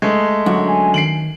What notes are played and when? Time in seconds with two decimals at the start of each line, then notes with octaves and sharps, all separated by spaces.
0.02 G#3 A3
0.46 F#2 D3 F#4
0.68 G#5
0.94 D#3 C7 D7 F#7